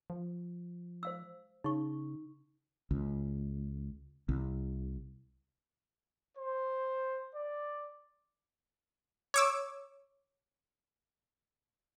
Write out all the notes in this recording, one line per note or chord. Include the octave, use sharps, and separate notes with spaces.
F3
C5 F5 E6
C#3 D#4 C#6
C#2
C2
C5
D5
C#5 D6 E6